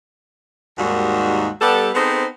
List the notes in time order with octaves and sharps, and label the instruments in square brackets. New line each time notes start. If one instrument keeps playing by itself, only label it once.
[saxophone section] D#2 G#2 D#3 G3 F#4
G3 B3 A4
B3 C4 D#4 G#4 A4 C5